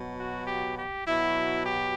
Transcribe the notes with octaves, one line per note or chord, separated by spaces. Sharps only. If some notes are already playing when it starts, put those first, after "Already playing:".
Already playing: B2 F#3
F#4
G4
G4
B2 F#3 E4
G4